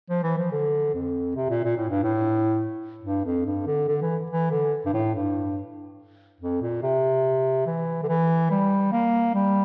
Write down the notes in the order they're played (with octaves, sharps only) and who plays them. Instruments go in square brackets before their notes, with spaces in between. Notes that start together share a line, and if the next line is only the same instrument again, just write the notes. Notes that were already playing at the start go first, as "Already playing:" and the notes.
[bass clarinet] F3
E3
F3
D3
F2
C3
A#2
A#2
A2
G2
A2
G2
F2
G2
D3
D3
E3
E3
D3
G2
A2
G2
F2
A#2
C3
E3
D3
E3
G3
A#3
G3